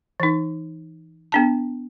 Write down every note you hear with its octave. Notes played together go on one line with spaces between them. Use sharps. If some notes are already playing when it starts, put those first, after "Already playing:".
E3 D#4
B3 D4 A5